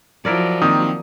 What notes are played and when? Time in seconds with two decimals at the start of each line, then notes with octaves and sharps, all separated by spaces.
0.25 F3 F#3 E4 A#4 D5
0.62 D#3 A#3 C4 D#6